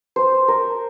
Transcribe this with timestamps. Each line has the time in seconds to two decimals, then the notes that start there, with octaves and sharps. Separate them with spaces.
0.16 C5
0.48 A#4